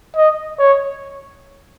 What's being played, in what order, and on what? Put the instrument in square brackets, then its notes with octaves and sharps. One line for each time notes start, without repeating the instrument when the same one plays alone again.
[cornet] D#5
C#5